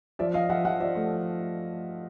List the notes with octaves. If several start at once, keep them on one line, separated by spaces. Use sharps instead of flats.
F3 D5 E5
F3 D#5 F5
F3 E5 F#5
F3 E5 F#5
F3 D5 E5
A3